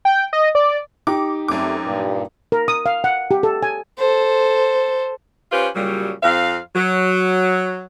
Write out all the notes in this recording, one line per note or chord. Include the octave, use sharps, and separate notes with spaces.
G5
D#5
D5
D#4 G4 D6
F#2 G3 A3 C4 D6
G2 A#2
A#4
D#6
F5
F#5
G4
A4
G#5
A4 C5
C#4 F4 G4 B4 C5
A#2 C#3 F#3 G3
F2 C4 F5
F#3